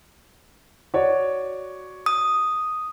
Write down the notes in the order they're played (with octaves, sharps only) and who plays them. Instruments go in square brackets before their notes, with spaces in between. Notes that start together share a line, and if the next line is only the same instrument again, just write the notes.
[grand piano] F#4 C#5 D5
[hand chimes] D#6